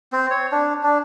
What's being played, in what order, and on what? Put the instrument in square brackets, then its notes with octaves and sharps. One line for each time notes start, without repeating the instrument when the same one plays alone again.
[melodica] C4
C#5
D4
D4